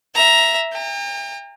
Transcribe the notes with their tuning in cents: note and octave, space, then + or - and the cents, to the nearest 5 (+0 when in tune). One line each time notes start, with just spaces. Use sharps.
E5 +0 A#5 +10
G5 +40 A#5 -25